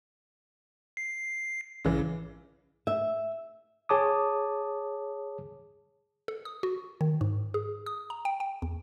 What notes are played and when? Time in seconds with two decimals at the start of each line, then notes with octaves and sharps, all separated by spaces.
0.97 C7
1.85 A#1 C#3 E3
2.87 E5
3.89 G#4 C#5 A5 D6 D#6
6.28 A4
6.45 D#6
6.63 F#4
7.01 D#3
7.21 G#2
7.54 G#4
7.86 D#6
8.10 A#5
8.25 G5
8.40 G5
8.62 E2